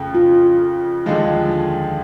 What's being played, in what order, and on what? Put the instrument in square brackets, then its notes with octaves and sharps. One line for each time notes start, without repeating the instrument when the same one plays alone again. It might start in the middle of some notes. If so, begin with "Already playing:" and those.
Already playing: [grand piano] F2 C#3 A3
[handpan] F4
[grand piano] D#2 D3 F3 G#3